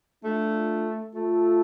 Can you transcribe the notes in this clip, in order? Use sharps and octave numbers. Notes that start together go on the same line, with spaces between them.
A3 D4 F4
A3 F4 A4